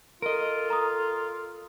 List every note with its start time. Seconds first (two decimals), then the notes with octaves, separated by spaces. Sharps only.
0.22 F4 A4 A#4 D#5
0.70 A#5 D#6